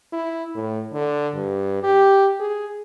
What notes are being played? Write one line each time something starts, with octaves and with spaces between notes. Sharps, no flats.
E4
A2
D3
G2
G4
G#4